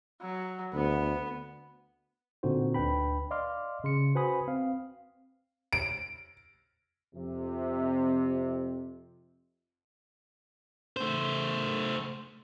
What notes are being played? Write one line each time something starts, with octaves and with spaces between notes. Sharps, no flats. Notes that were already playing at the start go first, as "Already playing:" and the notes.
F#3
D2 B3
A#2 D3 C4 D#4 F#4 C5
D2 D4 B4 G5 B5
D5 D#5 F5 C6 D6 F6
C#3 C6 C#7
F#4 B4 C5 G#5 B5 D#6
C4 F5
D7
F2 C3
A3 C5